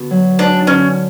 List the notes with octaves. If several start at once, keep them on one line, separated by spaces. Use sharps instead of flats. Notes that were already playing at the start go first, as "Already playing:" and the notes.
Already playing: D3 B3 F#4
F#3
G#3 D4
D3 C#4